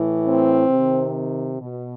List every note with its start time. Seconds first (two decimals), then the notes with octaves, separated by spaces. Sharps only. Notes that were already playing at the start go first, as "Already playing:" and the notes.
Already playing: A2 E3
0.25 C4
0.70 C3
0.75 D#3
1.61 B2